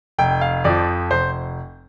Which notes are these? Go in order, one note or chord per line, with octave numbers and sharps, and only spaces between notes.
F1 G5
F5
F2 F3 D5
F1 C5